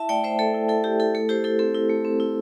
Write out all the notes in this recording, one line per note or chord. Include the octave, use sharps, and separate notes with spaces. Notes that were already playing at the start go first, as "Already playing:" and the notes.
Already playing: E4 E5 A5
A3 D5 G5
A3 C5 E5
A3 A4 D5
E4
E4 A4
E4 G4
E4 A4
A3 A4
E4 G4 C5
E4 A4
C4 A4
E4
A3
C4
E4